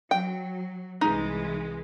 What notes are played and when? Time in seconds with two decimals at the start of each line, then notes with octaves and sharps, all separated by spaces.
0.11 F#3 G5
1.01 C2 E3 G#3 D#4